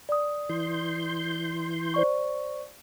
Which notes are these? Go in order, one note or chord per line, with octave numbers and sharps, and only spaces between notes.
D5 D#6
E3 C6 G6
C5 D5 C#6